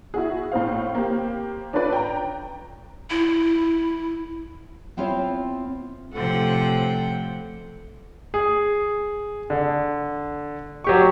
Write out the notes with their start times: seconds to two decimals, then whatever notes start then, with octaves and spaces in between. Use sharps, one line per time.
0.14 E4 F#4 G#4
0.52 A2 C4 C5 F5
0.95 A#3 C4 G4
1.73 C#4 D4 F4 A4 B4 D5
1.93 G5 A#5
3.10 E4
4.97 B3 C4 E4 F4 C5 C#5
6.13 A2 C3 F3 A4 F#5 G5
8.34 G#4
9.50 D3
10.84 F#3 G4 C#6